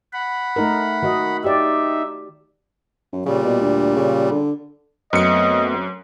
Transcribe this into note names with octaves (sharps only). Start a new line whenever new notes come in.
F#5 B5
A3 D#4 A#4
D#3 F#4 D#5
D#4 G4 D5 E5
F#2
A#2 C#3 G3
B2
D2
C#3
D3
F#2 A3 B3 C4 D#5 C#7